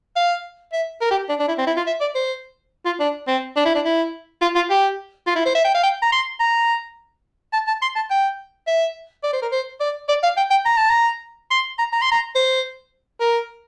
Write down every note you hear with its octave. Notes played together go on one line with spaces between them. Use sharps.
F5
E5
A#4
G4
D4
D4
E4
C4
E4
F4
E5
D5
C5
F4
D4
C4
D4
E4
D4
E4
F4
F4
G4
F4
E4
C5
E5
G5
F5
G5
A#5
C6
A#5
A5
A5
C6
A5
G5
E5
D5
C5
A#4
C5
D5
D5
F5
G5
G5
A#5
A5
A#5
C6
A#5
A#5
C6
A#5
C5
A#4